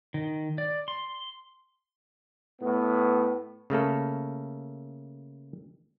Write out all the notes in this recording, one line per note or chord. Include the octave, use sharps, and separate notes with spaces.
D#3
D5
C6
A2 B3
C#3 A3 A#3 A4